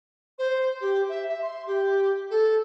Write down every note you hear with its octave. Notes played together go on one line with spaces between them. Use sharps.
C5
G4
E5
E5
C6
G4
A4